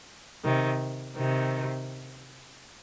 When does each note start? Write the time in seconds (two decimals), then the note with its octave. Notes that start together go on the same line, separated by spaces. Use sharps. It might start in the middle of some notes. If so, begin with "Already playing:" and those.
0.44 C3 D#3
1.17 C3 D#3